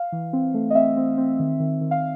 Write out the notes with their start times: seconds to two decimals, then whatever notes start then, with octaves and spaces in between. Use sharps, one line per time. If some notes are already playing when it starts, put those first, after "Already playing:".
Already playing: F5
0.12 E3
0.33 C4
0.54 A3
0.70 D#5
0.75 C4 E5
0.97 C4
1.18 C4
1.40 D#3
1.60 D#3
1.81 D#3
1.91 F5